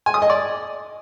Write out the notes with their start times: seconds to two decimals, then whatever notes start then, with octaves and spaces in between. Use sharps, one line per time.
0.06 G#5
0.14 D#6
0.22 D#5
0.30 D5